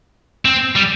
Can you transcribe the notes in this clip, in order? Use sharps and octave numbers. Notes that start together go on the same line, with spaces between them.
C4
G3